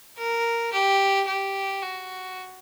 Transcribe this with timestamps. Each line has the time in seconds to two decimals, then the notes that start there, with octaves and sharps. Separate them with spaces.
0.18 A#4
0.72 G4
1.27 G4
1.82 F#4